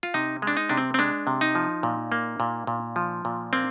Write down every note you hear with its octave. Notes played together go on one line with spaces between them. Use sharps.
F4
C3 D#4
G#3
D4
D#4
C3 D4
C4
C4
G#3 D4
C3
D#4
F3
A#2
A#3
A#2
A#2
F3
A#2
A#3 C4